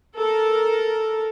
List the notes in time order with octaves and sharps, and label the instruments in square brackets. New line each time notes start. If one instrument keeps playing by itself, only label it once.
[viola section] A4 A#4